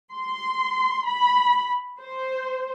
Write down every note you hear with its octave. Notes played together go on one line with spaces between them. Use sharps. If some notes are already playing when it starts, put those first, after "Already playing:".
C6
B5
C5